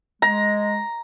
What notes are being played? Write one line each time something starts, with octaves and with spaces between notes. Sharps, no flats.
G#3 A#5